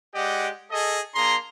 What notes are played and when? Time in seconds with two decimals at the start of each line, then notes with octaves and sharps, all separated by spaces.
0.14 G#3 G4 D5 D#5 F#5
0.71 G#4 A4 D#5
1.15 A#3 D4 G#4 A#5 C6